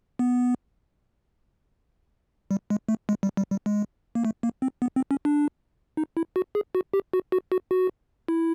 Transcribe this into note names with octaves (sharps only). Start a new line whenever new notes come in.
B3
G3
G#3
A3
G#3
G3
G3
G3
G#3
A#3
A3
A#3
C4
B3
C4
C#4
D4
D#4
E4
F#4
G#4
F#4
G4
F#4
F#4
F#4
F#4
E4